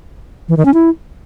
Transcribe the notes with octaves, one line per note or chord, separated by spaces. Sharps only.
E3
D#3
C#4
E4